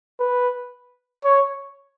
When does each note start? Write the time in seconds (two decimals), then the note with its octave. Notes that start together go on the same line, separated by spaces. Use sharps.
0.20 B4
1.24 C#5